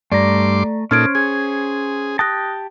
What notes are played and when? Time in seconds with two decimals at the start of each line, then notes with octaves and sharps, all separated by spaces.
0.12 G2 A3 D5 A#5 C6 D6
0.91 A#2 C#4 D#4 A4 C5 F6 G#6 D7
1.15 G#4 G#6
2.19 G4 G5 A5 D#6 F#6 A#6